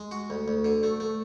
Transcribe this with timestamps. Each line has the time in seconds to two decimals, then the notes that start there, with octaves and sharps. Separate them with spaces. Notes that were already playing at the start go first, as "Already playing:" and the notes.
Already playing: G#3
0.11 F#4
0.30 D2
0.48 D2
0.65 D3
0.83 A3
1.00 A3